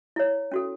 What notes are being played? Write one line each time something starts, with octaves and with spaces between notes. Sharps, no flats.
E4 C#5
C#4 F#4 A4